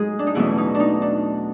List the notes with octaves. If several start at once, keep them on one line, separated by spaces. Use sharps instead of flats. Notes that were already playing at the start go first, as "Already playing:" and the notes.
Already playing: A2 F#3 G#3 D#4 G#4
D4
D#4
E2 B2 E3 F#3 A3 C#4 E4
D#4
D4
D#4
D4